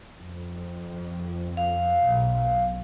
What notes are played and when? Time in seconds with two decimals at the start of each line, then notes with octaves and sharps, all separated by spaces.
0.19 F2
1.57 F5
2.07 B1